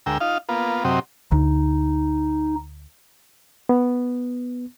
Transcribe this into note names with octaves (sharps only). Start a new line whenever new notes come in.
D2 G#3 A#4 G5 E6
D#4 F4 F5
A#3 B3 F4
F#2 C3 F#3 C4 G4 D#5
D2 D#4
B3